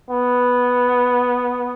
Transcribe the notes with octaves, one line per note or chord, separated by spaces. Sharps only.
B3